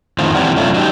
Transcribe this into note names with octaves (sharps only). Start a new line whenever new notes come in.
F2 A2 D#3 C4 F4
E3 C4 E4 G4 D5 F#5
F#2 C3 A3 C#4 D4 F4
F#3 D#4 G4